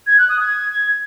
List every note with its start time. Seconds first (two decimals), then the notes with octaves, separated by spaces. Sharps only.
0.07 G#6
0.18 F#6
0.29 D#6
0.40 G#6